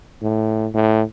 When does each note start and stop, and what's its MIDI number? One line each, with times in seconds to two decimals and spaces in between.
0.22 0.68 45
0.74 1.02 45